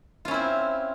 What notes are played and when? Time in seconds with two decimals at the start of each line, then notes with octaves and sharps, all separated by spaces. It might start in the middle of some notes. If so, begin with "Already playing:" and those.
0.25 F4
0.28 C#4
0.31 E4
0.34 C4